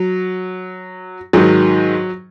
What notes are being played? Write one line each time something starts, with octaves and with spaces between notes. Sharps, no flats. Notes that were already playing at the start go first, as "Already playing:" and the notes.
Already playing: F#3
G#2 D#3 F#3